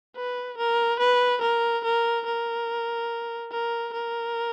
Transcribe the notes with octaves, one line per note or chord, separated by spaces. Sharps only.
B4
A#4
B4
A#4
A#4
A#4
A#4
A#4